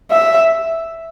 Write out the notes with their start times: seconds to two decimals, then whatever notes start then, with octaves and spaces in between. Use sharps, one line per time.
0.11 E5